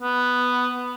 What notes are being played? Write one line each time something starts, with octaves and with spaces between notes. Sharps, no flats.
B3